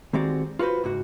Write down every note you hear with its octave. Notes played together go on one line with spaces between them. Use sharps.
D#3 G#3 C4 F#4 G4 D5
F4 F#4 A4 B4 C5
C#2 G#2 F#4